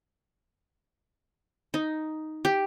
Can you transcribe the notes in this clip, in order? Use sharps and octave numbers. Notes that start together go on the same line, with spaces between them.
D#4
G4